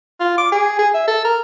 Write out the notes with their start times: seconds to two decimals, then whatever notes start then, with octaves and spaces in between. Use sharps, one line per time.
0.20 F4
0.38 D6
0.52 G#4
0.79 G#4
0.94 E5
1.07 A4
1.25 A#4